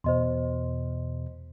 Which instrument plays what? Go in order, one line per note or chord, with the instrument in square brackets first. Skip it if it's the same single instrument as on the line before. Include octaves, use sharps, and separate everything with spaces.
[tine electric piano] E2 B2 [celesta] C5 D#5 C6